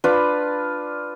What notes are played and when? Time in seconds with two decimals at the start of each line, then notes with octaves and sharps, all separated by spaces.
0.04 D4 F4 B4 B5